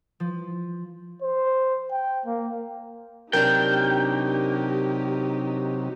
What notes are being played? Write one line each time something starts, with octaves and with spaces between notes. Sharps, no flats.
F3
C5
G5
A#3
C3 F#3 D4 D#4 G4 A#4 G5